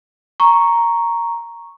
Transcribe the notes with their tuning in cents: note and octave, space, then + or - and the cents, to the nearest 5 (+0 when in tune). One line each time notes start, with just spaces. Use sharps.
A#5 +0 C#6 +0